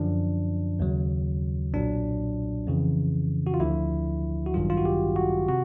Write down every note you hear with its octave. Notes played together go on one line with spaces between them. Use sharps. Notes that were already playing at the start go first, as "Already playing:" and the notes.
Already playing: F#2 D3 F3 D4
D#2 C#3 F#3
B1 A#2 F#3 D4
F2 C#3 E3
F#4
F4
D2 D3 F3 E4
F#4
A1 G2 D#3 F#3 F4
F4
F#4
G4
F#4
C3 F#4